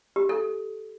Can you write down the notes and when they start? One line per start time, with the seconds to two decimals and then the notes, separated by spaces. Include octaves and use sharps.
0.16 G4
0.29 A4